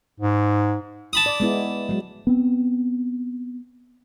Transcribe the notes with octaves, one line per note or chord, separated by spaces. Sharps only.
G#2
A5 B5 D#6
D5
G#3 B3 E4
F#3 G#3
B3 C4